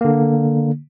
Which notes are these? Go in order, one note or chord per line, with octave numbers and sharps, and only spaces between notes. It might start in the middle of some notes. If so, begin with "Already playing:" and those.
D3 A#3